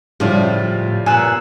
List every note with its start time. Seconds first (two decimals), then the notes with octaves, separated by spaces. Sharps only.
0.20 A2 C#3 F3 G3 A3 F4
1.06 A#2 B3 G#5 E6 F#6